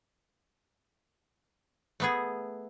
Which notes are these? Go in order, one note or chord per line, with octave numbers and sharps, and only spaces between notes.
A3 B3 G#4